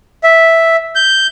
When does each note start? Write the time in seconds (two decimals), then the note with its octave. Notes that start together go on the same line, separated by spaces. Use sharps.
0.24 E5
0.95 G6